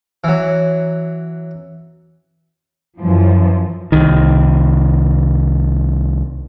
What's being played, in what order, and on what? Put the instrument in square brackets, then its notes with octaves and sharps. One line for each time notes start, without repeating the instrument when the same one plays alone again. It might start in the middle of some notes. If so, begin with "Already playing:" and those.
[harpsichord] E3 F#3
[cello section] F#2 E3 F3
[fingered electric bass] C2 D#3